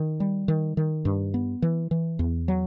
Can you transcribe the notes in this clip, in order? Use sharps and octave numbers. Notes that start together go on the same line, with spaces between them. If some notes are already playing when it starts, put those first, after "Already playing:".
Already playing: D#3
G3
D#3
D#3
G2
B3
E3
E3
E2
F#3